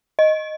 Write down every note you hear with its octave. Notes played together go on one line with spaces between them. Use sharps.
D#5